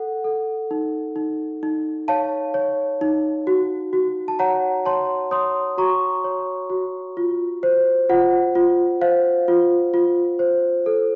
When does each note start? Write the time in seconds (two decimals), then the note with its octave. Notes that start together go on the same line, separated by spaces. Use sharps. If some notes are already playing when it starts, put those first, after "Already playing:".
Already playing: A4 F#5
0.24 A4
0.71 D#4
1.16 D#4
1.63 D#4
2.08 C#5 F5 A5
2.54 C#5
3.01 D#4
3.47 F#4
3.93 F#4
4.28 A5
4.39 C#5 F#5 A#5
4.86 C#5 A5 C6
5.31 C#5 C6 D#6
5.78 F#4 A#5 C#6
6.24 C#5
6.70 F#4
7.17 F4
7.63 C5
8.09 F4 F#5
8.55 F4
9.01 C5 F5
9.48 F4
9.94 F4
10.39 C5
10.86 A4